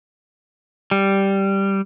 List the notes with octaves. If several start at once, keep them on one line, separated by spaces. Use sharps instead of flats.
G3